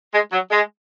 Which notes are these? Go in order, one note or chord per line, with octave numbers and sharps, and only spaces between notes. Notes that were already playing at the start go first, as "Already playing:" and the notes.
G#3
F#3
G#3